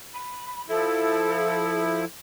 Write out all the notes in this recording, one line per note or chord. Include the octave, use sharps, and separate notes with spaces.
B5
F3 E4 A4